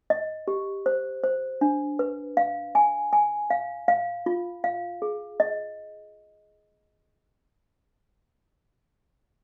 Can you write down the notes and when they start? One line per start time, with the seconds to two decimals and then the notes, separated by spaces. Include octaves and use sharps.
0.10 D#5
0.48 G4
0.86 C5
1.24 C5
1.61 D4
1.99 B4
2.37 F5
2.75 G#5
3.13 G#5
3.50 F5
3.88 F5
4.26 F4
4.64 F5
5.02 G#4
5.40 D#5